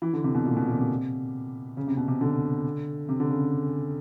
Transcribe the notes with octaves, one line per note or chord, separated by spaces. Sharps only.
E3
D3
C3
B2
A#2
B2
A#2
C3
C#3
C3
B2
C3
D3
C3
D3
C#3